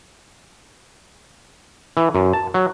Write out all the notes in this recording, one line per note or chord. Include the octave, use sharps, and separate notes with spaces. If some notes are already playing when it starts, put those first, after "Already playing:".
E3
F#2
A5
F#3